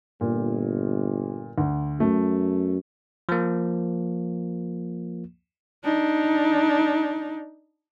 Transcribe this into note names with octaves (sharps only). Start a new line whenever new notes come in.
G1 A#2
D2
F#2 A3
F3 A#3
D4 D#4